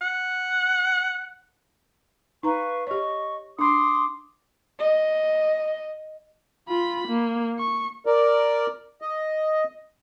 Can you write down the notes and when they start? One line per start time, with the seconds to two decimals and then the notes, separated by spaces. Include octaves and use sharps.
0.02 F#5
2.43 D#4 B4 F5 A#5 C#6
2.87 G4 C#5 D#5 C#6
3.59 D4 B5 C6 D6 D#6
4.80 D#5
6.69 F4 B5
7.08 A#3
7.59 C#6
8.06 A#4 D5
9.02 D#5